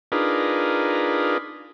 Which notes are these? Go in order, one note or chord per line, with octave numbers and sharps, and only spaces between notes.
D4 D#4 F4 G#4 A#4 B4